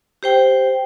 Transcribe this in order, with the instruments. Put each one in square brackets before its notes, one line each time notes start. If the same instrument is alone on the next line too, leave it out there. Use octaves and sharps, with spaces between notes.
[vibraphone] G4 C5 G5